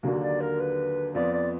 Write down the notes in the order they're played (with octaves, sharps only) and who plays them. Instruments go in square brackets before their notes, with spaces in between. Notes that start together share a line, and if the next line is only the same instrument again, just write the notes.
[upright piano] D#2 D3 F#3 A#3 D4 [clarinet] F#4
[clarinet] D5
A#4
B4
[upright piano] F2 F3 B3 [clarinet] D5
[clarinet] D5